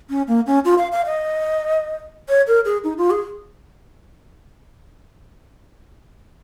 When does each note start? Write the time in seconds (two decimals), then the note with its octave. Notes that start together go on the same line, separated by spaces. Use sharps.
0.09 C#4
0.28 A#3
0.47 C#4
0.65 F4
0.78 F5
0.92 F5
1.06 D#5
2.29 C#5
2.47 A#4
2.65 G#4
2.84 D#4
2.98 F4
3.10 G#4